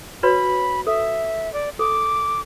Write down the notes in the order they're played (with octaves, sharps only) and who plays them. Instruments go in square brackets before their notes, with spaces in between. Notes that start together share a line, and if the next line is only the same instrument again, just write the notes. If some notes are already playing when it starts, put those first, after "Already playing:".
[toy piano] F#4 B4 C#5 [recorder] B5
[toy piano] A4 [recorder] E5
[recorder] D5
[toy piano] A4 [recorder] D6